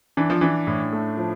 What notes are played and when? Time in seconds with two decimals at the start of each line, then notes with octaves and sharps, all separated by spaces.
0.17 E3 D4
0.30 F3
0.41 E3 D4
0.67 A2
0.93 A3
1.17 F3